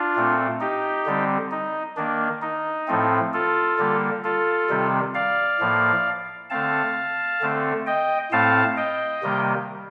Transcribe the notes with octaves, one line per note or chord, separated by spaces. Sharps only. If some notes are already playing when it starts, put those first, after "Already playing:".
Already playing: D4 F4
A#2 A3 C4
D#4 G4
D3 G3 C4
D#4
D#3 A#3 D4
D#4
A2 F3 A3 C4
F4 A4
D3 G3 A#3
F4 A4
C3 D#3 G3 C4
D5 F5
A2 F3 A#3
D3 A3 C4 F5 A5
D3 A3 C4
D#5 G5
A2 A3 C4 F5 A5
D#5 G5
C3 D#3 G3 A#3